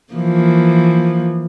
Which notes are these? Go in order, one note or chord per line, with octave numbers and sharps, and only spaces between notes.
E3 F3 A#3